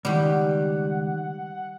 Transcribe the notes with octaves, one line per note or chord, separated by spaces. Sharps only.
C#2 D#3 G3 G4 F#5